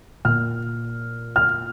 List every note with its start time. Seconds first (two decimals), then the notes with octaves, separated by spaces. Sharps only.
0.25 A#2 F6
1.36 F6